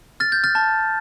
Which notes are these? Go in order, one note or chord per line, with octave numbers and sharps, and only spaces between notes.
F6 A6
G6
F6 A6
A5